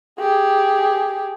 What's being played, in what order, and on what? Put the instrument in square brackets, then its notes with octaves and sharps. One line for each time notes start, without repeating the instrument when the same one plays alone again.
[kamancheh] G4 G#4